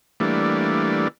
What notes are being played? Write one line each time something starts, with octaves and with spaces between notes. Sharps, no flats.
E3 G3 A3 A#3 D4